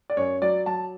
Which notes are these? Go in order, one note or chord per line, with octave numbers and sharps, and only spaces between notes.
D5
F#2 C#5
F#3 D5
F#3 A5